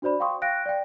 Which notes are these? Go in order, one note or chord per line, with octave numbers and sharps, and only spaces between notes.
D4 F#4 C5 D5 B5
F5 G5 C6 C#6 D#6
F5 G5 F#6 A#6 D7
D5 G5